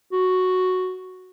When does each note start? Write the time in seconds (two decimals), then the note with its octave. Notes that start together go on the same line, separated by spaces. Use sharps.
0.12 F#4